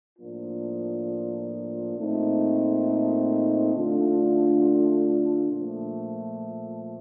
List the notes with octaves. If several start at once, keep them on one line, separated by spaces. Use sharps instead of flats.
A2 F3 A#3 D4 F4
A#2 A3 C4 D#4
D3 A3 D4 F4
A#2 F3 A3